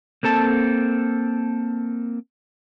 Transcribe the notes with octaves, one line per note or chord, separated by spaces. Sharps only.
A#3 C4 A4 A5